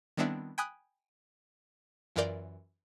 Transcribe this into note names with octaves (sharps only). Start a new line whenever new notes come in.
D#3 G3 B3 C4 D4 E4
G5 G#5 B5 D#6 F#6
F#2 E3 F4 A#4 D5 G6